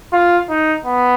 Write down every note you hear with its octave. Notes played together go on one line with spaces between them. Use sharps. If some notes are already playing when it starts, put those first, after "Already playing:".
F4
D#4
B3